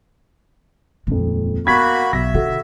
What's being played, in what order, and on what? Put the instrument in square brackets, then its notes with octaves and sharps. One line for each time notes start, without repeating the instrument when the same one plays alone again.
[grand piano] D#1 F2 [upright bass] G#3
[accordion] A#3 F#4 B5 [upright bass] B3 [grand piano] G#6 B6
[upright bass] B1 [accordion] E5 [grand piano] A#6
[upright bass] D3 [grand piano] F#4 A4